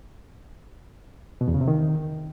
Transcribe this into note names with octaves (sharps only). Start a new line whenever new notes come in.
B2
E2
C#3
C3
D#3